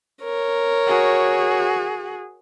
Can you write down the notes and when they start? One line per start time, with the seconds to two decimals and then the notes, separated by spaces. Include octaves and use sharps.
0.23 A#4 C#5
0.87 F#4 G#4